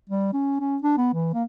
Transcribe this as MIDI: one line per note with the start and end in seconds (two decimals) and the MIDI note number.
0.10 0.31 55
0.33 0.55 61
0.60 0.77 61
0.82 0.94 62
0.97 1.12 59
1.13 1.29 52
1.34 1.44 58